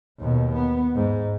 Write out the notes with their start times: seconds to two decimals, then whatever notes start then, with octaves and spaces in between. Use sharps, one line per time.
0.20 D#2 B2
0.55 B3
0.95 G#2